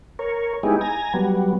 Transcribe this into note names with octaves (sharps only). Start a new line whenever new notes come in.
A#4 C#5
G#3 B3 D#4 E4 G4 G#4
G#5 A#5
F#3 G3 B3